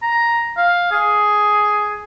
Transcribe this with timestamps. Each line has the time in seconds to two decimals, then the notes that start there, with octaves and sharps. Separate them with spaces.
0.02 A#5
0.57 F5
0.91 G#4